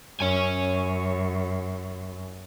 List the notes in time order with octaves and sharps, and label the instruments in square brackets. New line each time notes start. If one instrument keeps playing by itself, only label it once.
[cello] F#2 [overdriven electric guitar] C#5 G#5